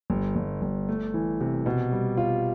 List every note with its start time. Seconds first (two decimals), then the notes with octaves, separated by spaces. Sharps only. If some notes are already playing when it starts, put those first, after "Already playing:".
0.10 G1
0.36 G1
0.62 G1
0.88 A3
1.14 E3
1.40 C3
1.66 B2
1.92 G3
2.17 F4